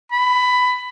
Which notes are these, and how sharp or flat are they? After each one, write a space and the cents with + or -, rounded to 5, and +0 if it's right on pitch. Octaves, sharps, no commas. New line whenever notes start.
B5 +15